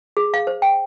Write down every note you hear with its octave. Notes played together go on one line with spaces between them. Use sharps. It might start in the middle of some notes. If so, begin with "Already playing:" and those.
G#4
F5
C5
G5